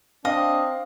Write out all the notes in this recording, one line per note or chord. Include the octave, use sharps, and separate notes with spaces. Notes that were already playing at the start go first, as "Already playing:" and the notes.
C4 D4 D#5 F5